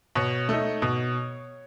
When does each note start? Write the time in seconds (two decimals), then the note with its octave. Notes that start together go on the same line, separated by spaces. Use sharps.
0.15 B2 C#5
0.49 A3 D#4
0.82 B2